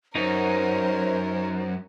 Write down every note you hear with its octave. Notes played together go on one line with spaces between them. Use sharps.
F#2 D#4 A#4 C5 C#5